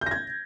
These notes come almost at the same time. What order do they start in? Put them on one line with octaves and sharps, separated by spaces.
G6 A#6 G#6